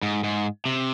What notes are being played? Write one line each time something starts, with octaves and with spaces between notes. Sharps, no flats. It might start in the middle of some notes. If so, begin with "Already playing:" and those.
G#2
G#2
C3